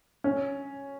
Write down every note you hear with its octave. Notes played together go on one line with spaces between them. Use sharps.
C#4